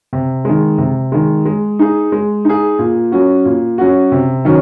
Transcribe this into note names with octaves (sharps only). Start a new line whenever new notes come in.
C3
D#3 G#3
C3
D#3 G#3
G#3
D#4 G#4
G#3
D#4 G#4
A#2
F#3 C#4 F#4
A#2
F#3 C#4 F#4
C3
D#3 F#3 C#4